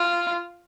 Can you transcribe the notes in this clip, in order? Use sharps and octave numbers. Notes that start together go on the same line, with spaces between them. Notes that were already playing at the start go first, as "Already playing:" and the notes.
Already playing: F4